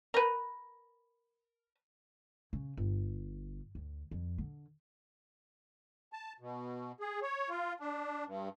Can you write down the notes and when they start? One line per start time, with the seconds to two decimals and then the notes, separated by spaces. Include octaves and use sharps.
0.14 A#4 B4
2.53 C#3
2.77 G1
3.75 D2
4.11 F2
4.38 D3
6.13 A5
6.40 B2
7.00 G#4
7.22 C#5
7.50 F4
7.80 D4
8.26 G2